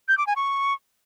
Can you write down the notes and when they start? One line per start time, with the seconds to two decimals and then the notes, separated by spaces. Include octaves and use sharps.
0.08 G6
0.18 D6
0.27 G#5
0.36 C#6